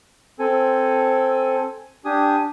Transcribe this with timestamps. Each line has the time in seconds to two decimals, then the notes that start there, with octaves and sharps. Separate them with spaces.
0.39 C4 A4 G#5
2.05 D4 G4 G#5 D#6